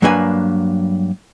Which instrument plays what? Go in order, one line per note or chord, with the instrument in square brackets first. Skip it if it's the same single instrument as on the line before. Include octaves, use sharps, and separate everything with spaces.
[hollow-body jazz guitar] G2 F#3 A#3 D4 B4 G#5